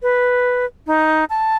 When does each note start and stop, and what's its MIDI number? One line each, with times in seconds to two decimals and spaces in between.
0.02 0.65 71
0.87 1.25 63
1.30 1.57 81